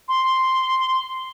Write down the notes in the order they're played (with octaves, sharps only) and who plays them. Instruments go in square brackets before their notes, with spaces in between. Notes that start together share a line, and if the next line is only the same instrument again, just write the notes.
[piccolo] C6